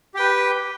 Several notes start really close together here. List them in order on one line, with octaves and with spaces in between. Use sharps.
G4 G5 B4